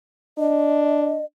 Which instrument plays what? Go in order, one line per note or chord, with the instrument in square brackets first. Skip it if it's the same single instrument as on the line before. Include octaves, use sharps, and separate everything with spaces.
[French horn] D4 [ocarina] D#5